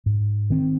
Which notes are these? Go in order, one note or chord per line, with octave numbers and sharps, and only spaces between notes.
G#2
D#3 C4